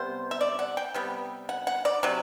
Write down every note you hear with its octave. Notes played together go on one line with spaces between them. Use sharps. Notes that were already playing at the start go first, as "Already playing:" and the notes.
Already playing: C3 G3 B3 C5
E5
D5
F#5
G5
C3 G3 B3
F#5
F#5
D5
C3 F#3